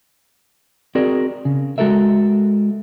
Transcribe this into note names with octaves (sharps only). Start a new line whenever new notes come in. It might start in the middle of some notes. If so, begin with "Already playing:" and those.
C4 F#4 G#4 A#4 D5
C#3
G#3 F#4 A4 A#4 E5